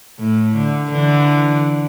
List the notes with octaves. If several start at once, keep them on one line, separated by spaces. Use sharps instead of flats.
A2
D3
D3 E3